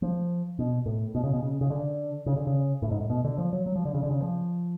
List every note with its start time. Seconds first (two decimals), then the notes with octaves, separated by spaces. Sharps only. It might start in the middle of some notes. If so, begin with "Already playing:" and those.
0.02 F3
0.59 B2
0.86 A2
1.15 B2
1.23 C#3
1.33 B2
1.43 C#3
1.61 C#3
1.70 D3
2.26 C#3
2.36 D3
2.47 C#3
2.82 A2
2.91 G#2
3.01 A2
3.10 B2
3.24 D3
3.38 F3
3.53 F#3
3.66 F#3
3.76 F3
3.85 D3
3.94 C#3
4.03 D3
4.11 C#3
4.22 F3